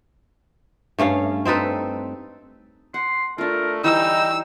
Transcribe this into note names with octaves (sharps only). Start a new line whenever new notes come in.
G2 A3 C#4 F5
C4 D#4 A4 B4
F#5 C6
A3 D4 F4 A#4
E3 G3 D#4 G5 E6